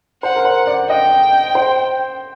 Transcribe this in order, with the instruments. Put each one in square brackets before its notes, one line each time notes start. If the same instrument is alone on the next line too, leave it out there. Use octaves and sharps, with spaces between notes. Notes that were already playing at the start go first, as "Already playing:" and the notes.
[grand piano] C5 [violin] F#5
[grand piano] A#4
C5
D5
[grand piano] D#5 [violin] G5
[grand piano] C5